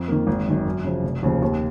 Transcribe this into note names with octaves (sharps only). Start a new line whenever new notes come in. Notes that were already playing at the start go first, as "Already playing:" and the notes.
Already playing: F2
D#3 A#3
G#1
F#2 D#3
F#2
C#3 F3
F1
D#2 C#3 F3
D#2